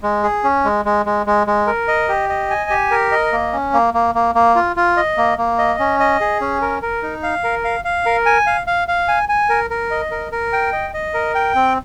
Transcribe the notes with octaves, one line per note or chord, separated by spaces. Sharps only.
G#3
G#4
C#4
G#3
G#3
G#3
G#3
G#3
A#4
D#5
G4
D#5
G#5
G4
A#4
D#5
A#3
C#4
A#3
A#3
A#3
A#3
F4
F4
D#5
A#3
A#3
D#5
C#4
D#5
G#4
C#4
A#4
A#4
D#4
F5
A#4
F5
F5
A#4
G#5
F5
F5
F5
G#5
G#5
A#4
A#4
D#5
A#4
A#4
G5
D#5
D#5
A#4
G5
C4